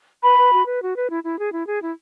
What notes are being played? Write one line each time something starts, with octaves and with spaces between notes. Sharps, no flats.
B4 B5
B4
F#4
B4
F#4
B4
E4
E4
G#4
E4
G#4
E4